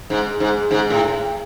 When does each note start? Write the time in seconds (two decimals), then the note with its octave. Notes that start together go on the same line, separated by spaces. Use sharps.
0.10 G#2
0.40 G#2
0.71 G#2
0.90 A2